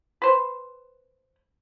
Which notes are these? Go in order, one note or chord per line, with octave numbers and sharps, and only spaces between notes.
B4 C5